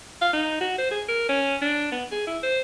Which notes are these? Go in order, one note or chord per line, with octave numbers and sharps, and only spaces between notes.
F5
D#4
F#4
C5
G#4
A#4
C#4
D4
B3
G#4
E4
C5